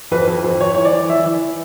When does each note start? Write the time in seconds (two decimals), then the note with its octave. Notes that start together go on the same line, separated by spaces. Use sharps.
0.11 F2 B4
0.27 F2
0.44 F2
0.60 F2 C#5
0.75 E3 C#5
0.85 D5
0.93 E3
1.09 E3 E5
1.26 E3